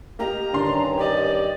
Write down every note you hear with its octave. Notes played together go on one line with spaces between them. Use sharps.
A#3 G4 D#5 A#5
G2 D3 D#3 C#4 D4 C6
G4 D5 D#5